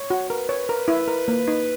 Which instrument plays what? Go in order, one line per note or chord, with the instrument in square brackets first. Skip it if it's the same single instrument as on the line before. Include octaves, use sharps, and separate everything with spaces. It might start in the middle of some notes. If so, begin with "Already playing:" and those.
Already playing: [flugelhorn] C#5
[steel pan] F#4
[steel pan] A#4 [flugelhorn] B4
[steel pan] C#5
A#4
E4
A#4
A#3
D#4